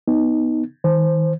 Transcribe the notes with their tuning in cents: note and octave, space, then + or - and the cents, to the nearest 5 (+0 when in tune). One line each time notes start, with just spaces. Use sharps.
B3 +0 D#4 +0
D#3 +35 C5 +0